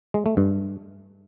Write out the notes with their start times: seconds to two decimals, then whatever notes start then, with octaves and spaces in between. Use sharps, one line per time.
0.14 G#3
0.26 A3
0.37 G2